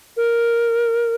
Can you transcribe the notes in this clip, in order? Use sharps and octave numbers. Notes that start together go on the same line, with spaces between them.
A#4